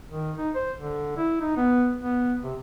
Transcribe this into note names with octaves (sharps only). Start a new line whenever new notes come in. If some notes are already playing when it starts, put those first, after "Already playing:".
D#3
D#4
C5
D3
E4
D#4
B3
B3
C3